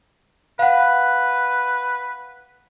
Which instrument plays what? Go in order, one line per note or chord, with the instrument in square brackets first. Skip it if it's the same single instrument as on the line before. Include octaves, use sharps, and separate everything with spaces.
[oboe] B4 [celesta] F5 F#5